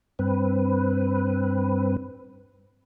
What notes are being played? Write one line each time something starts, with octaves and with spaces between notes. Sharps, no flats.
G2 C4 B4